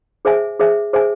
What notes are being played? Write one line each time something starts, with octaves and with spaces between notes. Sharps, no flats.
G#4 C5 E5 G#5
G#4 C5 E5 G#5
G#4 C5 E5 G#5